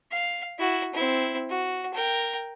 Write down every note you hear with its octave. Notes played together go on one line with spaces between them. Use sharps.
F5
E4 F#4
C4 E4
F#4
A#4 G5